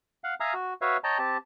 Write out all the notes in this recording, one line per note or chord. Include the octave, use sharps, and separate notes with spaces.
F5 F#5
E5 F5 G#5 A#5 D#6 F6
F#4
F#4 B4 C#5 E5 F5
C#5 D#5 G5 A5 A#5
C4 G4 A5